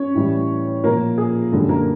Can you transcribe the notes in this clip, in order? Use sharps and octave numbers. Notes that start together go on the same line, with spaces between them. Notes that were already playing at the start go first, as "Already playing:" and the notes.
Already playing: C#4 C#5
A2 E3 G3
A#2 F3 A#3 A#4
G#4
F#2 D3 G3 A4
A#3 A#4